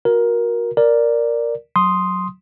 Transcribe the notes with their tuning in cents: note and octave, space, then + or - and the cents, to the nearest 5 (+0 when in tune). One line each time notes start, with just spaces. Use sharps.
F#4 -25 A#4 +15
A#4 +0 D5 +0
F#3 +0 C6 +0 D#6 +0